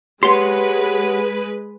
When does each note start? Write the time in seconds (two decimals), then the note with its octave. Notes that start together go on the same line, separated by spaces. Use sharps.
0.23 G#3 G4 B4 C#5 F#5 C6